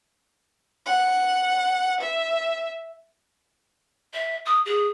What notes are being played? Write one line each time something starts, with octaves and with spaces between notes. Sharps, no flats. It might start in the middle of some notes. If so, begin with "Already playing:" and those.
F#5
E5
E5
D#6
G#4